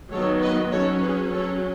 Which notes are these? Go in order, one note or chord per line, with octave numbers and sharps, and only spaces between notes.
D#3 F#3 B3 A4 C#5
B4 D#5
F#3 C#4 A4 C#5
G#4 B4
F#3 C#4 A4 C#5